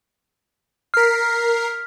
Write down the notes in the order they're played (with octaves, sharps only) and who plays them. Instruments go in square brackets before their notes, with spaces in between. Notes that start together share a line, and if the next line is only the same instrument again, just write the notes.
[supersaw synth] A#4 C7 [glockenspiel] F6 B6